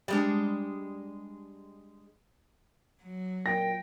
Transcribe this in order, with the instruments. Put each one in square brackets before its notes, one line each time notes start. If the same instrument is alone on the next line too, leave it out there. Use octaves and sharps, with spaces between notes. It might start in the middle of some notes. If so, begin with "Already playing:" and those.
[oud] G3 G#3 D4
[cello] F#3
[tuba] A#2 [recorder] G5 [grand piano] A#6